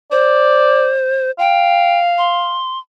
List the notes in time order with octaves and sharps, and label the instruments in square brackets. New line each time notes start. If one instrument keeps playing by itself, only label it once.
[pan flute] C5 [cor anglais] D5
[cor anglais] F5 [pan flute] G5
[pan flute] C6